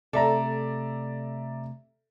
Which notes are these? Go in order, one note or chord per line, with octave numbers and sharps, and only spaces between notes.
C3 A3 A4 D5 E5 A#5